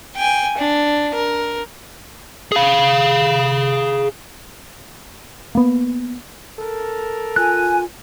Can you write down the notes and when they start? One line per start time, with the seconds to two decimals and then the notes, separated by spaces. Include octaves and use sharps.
0.16 G5 G#5
0.58 D4
1.15 A#4
2.52 G#4 F5
5.55 A#3 B3
6.60 A4 A#4
7.36 F4 G#5 F#6